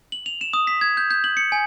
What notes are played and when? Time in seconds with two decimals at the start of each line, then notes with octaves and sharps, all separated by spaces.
0.12 F#7
0.26 F7
0.41 E7
0.53 D#6
0.67 B6
0.81 G#6
0.97 G6
1.11 G6
1.24 F#7
1.37 C#7
1.52 G#5